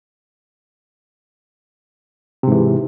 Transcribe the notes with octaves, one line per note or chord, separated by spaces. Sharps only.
G#2 C3 E3